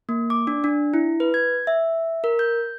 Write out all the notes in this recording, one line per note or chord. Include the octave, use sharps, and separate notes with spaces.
A#3
D6
D4
D4
E4
B4
G#6
E5
A#4
G6